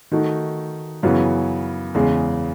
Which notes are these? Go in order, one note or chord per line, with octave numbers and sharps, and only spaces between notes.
D#3 A3 D#4 F#4
F#2 C#3 E3 B3 F#4
E2 C#3 G#3